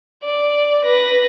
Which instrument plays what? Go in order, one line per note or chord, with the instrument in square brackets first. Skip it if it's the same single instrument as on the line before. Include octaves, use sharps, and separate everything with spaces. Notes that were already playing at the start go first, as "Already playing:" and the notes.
[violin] D5
B4 A#6